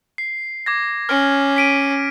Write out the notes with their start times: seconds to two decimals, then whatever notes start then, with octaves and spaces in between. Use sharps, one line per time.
0.18 C7
0.66 D6 G#6 A#6
1.09 C#4 F6
1.56 B6 D7 D#7